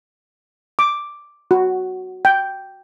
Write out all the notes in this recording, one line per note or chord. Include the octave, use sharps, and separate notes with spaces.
D6
F#4
G5